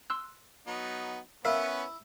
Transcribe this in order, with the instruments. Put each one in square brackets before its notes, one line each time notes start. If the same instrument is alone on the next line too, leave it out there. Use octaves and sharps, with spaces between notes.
[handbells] C6 E6 F#6
[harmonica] F#3 B3 D#4
[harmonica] B3 C#4 B4 [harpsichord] E4 [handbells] A#4 E5 F5